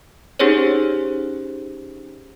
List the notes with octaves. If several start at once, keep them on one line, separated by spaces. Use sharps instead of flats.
C#4 D#4 G4 G#4 C5 C#5